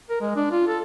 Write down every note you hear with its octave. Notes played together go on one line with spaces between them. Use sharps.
A#4
G#3
D4
F4
A4